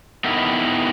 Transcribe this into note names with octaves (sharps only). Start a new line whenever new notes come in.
B3 D#4 E4 G4 A4 A#4